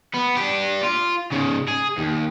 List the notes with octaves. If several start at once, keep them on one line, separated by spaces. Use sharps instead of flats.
B3
D4 G4
F4
G#2 C#3
G#4
D#2